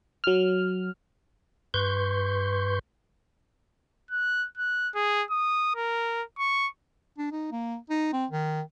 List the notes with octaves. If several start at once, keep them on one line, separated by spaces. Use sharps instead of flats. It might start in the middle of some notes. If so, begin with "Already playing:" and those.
F#3 F6
G2 B4 C6 C#6 G6
F#6
F#6
G#4
D#6
A#4
C#6
D4
D#4
A#3
D#4
C4
D#3